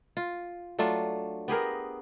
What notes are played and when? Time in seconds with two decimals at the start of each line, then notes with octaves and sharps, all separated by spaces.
0.17 F4
0.79 F#3 A3 D4 F4
1.48 B3 G4 G#4 A#4